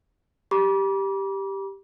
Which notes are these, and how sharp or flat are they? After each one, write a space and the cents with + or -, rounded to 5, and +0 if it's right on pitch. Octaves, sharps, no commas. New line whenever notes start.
G4 +0 B5 -45 D6 -20